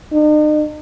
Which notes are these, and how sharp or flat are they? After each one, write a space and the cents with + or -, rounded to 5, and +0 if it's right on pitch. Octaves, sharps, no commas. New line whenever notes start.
D#4 -45